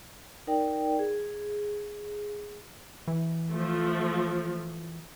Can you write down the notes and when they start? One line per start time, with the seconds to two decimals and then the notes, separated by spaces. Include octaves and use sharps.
0.47 D#4 A#4 D5 G5
0.99 G#4
3.07 E3
3.50 F3 A3